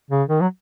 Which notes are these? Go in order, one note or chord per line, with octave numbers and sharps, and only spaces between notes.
C#3
D#3
F#3